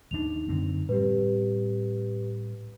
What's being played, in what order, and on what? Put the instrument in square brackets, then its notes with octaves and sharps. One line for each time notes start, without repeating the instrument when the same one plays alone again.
[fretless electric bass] G#1 D#2 D4 [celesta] D#4 F7
[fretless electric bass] F#2 D3 C4
[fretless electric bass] A2 G3 C4 [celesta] G4 B4